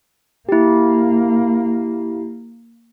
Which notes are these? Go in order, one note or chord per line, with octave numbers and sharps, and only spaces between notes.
A#3 E4 G4